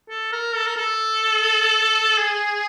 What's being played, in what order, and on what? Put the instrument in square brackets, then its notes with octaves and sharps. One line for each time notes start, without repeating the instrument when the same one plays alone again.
[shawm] A4
A#4
A4
A#4
A4
G#4